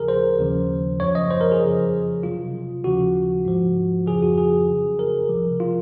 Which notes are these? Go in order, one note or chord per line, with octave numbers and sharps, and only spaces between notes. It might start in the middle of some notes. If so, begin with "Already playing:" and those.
Already playing: D#2 C#3 F3 G#4 A#4
C5
D#2 C#3 F3
F#2 F3 C#5
D#5
C5
A#4
G#4
F2 C#3 F3
C#2 C3 F#3 F4
D#2 C#3 F3 F#4
G#2 F3
F2 C#3 F3 G#4
F#4
G#4
F#2 C#3 F#3
A#4
C2 C3 F3
F4